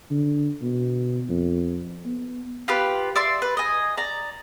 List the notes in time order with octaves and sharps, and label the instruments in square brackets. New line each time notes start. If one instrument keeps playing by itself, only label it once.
[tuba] D3
B2
F2
B3
[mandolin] F4 G4 B4
D5 E5 C6
B4
D#5 G#5
D5 A#5